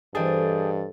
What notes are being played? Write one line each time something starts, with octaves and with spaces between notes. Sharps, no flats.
G2 E3 G#4 A4 C5 D#5 G5 A6